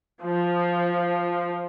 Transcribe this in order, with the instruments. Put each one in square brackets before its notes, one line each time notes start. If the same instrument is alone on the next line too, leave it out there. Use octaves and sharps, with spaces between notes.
[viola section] F3